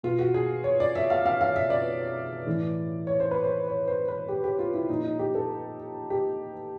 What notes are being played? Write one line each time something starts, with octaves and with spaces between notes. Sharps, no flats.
B2 F4
F#4
G#4
C#5
D5
E5
F5
F5
F5
E5
D5
A2 E3
C#5
C5
B4
C5
C#5
C5
B4
G4
G4
F4
E4
A#2 F3 D#4
D#4
G4
A4
G4